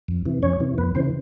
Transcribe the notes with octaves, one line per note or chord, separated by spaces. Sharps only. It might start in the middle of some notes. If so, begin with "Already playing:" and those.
F2
C3 E3
F2 C#4 C#5
C3 E3
F2 B3 B4
C#3 E3 C4 C5